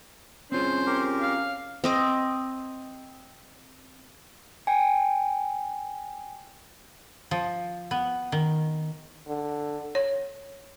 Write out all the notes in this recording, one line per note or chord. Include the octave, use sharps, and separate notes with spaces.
C4 C#4 F4 G#4 C5
G4 A#4
F5
C4 D#5 D6
G5 G#5
F3
B3
D#3
D3
C#5